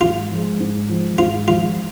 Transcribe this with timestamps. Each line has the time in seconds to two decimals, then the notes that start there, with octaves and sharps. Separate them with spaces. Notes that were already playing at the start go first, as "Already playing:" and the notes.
0.01 G#2 F4
0.31 F3 G#3
0.60 G#2
0.90 F3 G#3
1.18 G#2 F4
1.48 F3 G#3 F4